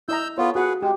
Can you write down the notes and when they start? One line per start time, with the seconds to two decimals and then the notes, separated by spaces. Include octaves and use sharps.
0.09 E4 D#5 A#5 E6 G6
0.38 B3 F4 A4 C#5
0.55 F#4 G#4 B4 F#5
0.83 G#3 G4